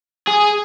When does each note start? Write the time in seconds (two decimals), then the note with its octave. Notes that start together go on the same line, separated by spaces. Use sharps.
0.27 G#4